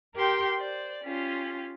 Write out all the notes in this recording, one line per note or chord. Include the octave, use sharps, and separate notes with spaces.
G4 A#4 G5 C6
C5 D5
C#4 F4 G4